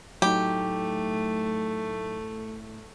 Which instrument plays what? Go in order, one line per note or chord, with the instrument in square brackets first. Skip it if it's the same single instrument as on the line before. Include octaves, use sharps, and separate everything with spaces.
[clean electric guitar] A2 [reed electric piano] F#3 D#4 [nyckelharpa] A3 [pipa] G4